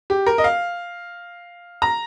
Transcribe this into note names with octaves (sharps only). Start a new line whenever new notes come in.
G4
A#4
D#5
F5
A#5